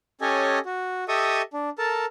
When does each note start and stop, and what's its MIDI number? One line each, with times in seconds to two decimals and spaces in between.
0.21 0.59 61
0.21 0.59 67
0.21 0.59 69
0.21 0.59 73
0.21 0.59 75
0.21 0.59 80
0.66 1.04 66
1.08 1.42 67
1.08 1.42 69
1.08 1.42 75
1.08 1.42 76
1.08 1.42 85
1.08 1.42 87
1.54 1.70 62
1.79 2.06 69
1.79 2.06 70
1.79 2.06 81